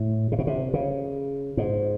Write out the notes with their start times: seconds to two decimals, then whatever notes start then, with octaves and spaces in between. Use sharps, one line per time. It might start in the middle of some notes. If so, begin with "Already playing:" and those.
Already playing: A2
0.32 C3
0.39 B2
0.47 C3
0.74 C#3
1.57 G#2